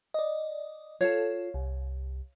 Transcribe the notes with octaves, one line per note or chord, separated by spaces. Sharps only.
D5 D#5
F4 A4 C#5 F5
C2